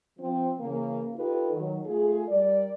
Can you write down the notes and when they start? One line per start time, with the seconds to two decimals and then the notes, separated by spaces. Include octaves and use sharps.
0.18 F3 C4
0.59 C#3 E3 A#3
1.16 D#4 F4 G4 A4 B4
1.52 D#3 F#3
1.85 A3 F4 G#4
2.28 G3 A#4 D5